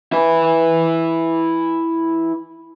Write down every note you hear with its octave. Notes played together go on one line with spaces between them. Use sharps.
E4 B4